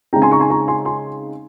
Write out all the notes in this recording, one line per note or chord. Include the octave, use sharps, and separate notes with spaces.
C#3 G#3 C4 D#4 G5 A#5
G#5 C6
A#5 C#6
G#5 C6
A#5 C#6
G#5 C6
G#5 C6